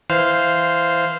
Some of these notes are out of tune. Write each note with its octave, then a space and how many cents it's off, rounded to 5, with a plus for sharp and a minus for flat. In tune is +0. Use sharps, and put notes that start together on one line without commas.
E3 +0 C5 -10 F5 +0